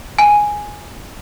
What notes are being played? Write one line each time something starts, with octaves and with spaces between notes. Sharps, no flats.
G#5